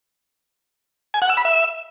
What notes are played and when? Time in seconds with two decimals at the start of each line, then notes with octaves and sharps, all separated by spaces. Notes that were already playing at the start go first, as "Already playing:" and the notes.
1.14 G#5
1.22 F#5
1.30 E6
1.37 B5
1.45 E5